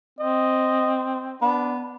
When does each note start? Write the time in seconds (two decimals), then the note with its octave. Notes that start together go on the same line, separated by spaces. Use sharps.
0.19 C4 D#5
1.42 B3 D4